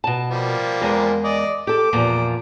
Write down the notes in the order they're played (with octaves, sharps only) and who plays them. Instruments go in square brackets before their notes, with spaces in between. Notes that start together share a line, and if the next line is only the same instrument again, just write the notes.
[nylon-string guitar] B2 A5
[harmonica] F3 G3 A#3
[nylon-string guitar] E2 G#3 A#4
[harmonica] D5 D#5
[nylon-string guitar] G4 A4 [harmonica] D6
[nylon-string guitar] E2 A#2 F3